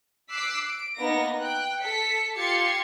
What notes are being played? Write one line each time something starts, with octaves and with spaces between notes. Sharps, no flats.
D6 E6 F#6 B6 C7 D7
D7
A#3 B3 D#4 A#6
G5 F#6
A4 B6 C#7
F4 G4 G#6 A6 C7 C#7